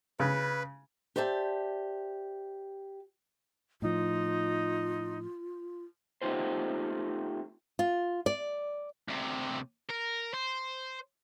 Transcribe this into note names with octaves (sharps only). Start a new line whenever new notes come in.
C#3 B4
G4 C5 D5 E5 A5
A2 F3 D#4 F4
A3 B3 D#4 F4 G4 C5
F4
D5
D2 C3
A#4
C5